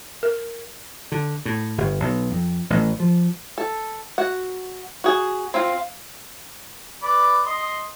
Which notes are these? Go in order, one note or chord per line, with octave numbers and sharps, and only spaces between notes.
A#4
D3
A2
G1
B1
F2
A1
F3
A4
F#4 F#5
F#4 G#4
C4 F4 F5
B4 D5 B5
D#5 C6 D#6